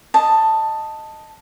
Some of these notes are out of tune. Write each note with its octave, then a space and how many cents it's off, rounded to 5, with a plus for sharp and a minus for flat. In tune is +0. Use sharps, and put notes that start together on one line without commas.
D#5 +0 A5 +5